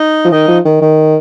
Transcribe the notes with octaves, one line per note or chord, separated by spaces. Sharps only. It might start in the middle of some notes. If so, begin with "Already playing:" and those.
Already playing: D#4 D#5
F3
D#3 D#4 D#5
F3
D#3
D#3